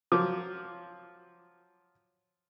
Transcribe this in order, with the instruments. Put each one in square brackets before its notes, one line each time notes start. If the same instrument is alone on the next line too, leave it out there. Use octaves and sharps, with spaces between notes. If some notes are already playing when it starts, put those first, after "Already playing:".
[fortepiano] F3 F#3 [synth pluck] D6